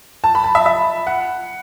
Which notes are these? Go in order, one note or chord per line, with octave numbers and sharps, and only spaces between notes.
A5
B5
A5
E5
E5
F#5